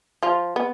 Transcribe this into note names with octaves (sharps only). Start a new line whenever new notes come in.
F3 F4
B3